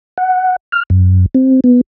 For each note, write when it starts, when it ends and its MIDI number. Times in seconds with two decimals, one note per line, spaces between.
0.18 0.56 78
0.72 0.83 89
0.90 1.26 42
1.35 1.60 60
1.64 1.81 59